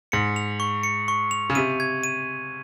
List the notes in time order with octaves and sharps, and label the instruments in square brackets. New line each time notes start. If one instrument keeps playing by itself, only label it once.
[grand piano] G#2 [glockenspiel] C#7
[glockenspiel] F7
C#6
C#7
C#6
F7
[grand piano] C#3
[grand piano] C3 [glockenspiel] D#7
[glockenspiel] G#6
D#7